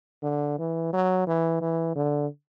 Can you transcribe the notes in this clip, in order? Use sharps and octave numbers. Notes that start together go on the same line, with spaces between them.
D3
E3
F#3
E3
E3
D3